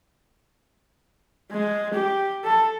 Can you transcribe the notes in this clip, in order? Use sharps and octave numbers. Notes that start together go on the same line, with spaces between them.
G#3
G4
A4